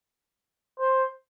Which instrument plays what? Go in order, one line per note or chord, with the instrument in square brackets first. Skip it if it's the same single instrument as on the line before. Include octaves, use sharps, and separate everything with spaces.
[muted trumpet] C5